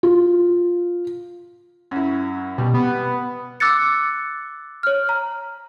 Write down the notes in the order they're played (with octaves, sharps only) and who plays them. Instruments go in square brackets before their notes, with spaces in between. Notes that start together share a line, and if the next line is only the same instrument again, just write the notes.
[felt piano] F4
[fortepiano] F#2 E4
[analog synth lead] B2 [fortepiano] G3
[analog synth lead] B3
[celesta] D6 E6 F#6 A6 C#7
C#5 F6
A#5